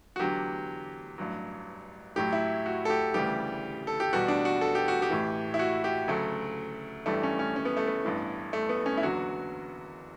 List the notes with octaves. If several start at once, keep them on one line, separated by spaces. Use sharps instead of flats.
F#4
E2 D3 F#3 G4
A1 G2 F#3
A1 A2 F#3 G4
E4
F#4
A4
G4
D2 C#3 E3 G3 G4
A4
G4
E2 B2 G3 F#4
D4
F#4
A4
G4
F#4
G4
A1 A2 E3
E4
F#4
G4
D2 C#3 F#3 A3
A1 G2 E3 G3 A3
C#4
C#4
C#4
B3
A3
B3
A1 G2 E3
A3
B3
C#4
E4
F#1 E2 D3 F#3 F#4